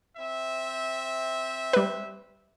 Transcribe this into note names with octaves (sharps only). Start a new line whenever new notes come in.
C4 E5
G3 B4